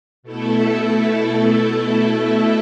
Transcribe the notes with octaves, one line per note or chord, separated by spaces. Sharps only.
B2 A3 E4 A4